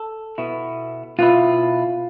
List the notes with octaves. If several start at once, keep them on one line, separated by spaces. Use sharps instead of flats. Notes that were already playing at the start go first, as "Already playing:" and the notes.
Already playing: A4
B2 B3 E4
B2 B3 E4 F4